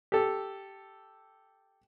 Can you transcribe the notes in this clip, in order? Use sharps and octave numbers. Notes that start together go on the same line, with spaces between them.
G4 A4